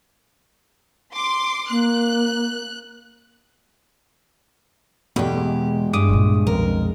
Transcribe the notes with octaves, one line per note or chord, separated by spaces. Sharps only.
C6 D6
A#3 F#6
E2 B2 A3 G4
G#3
G2 D6 D#6
A#2 F#3
B1 F2 A#4